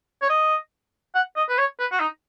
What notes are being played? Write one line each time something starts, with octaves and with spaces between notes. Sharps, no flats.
C#5
D#5
F#5
D#5
B4
C#5
B4
F#4
D#4